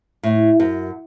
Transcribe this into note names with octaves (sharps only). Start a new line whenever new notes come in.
A2
F#2